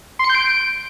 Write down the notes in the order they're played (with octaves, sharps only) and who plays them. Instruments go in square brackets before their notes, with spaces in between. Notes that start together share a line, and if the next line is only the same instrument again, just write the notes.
[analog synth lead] C6
C#7
G6
D7